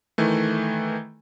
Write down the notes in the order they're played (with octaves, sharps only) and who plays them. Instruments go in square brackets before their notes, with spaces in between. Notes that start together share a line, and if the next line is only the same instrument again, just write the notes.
[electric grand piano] D#3 E3 A3